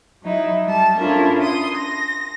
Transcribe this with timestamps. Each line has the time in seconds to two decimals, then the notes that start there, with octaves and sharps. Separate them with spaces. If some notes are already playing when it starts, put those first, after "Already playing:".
0.23 F#3 D#4 E4
0.66 G3 A5
0.98 C#4 D4 E4 F4 A4 A#4
1.41 C6 D#6
1.76 A#6